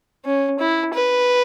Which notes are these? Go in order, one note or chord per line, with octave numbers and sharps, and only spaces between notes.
C#4
E4
B4